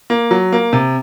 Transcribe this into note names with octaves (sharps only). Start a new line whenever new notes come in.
A#3
F#3
A#3
C3